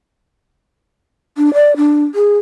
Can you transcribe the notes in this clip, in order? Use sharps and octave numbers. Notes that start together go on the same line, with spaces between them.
D4
D5
D4
G#4